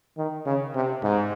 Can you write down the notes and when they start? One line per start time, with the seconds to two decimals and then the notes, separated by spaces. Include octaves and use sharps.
0.18 D#3
0.46 C#3
0.75 C3
1.03 G#2